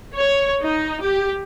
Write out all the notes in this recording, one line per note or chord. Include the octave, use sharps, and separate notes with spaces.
C#5
D#4
G4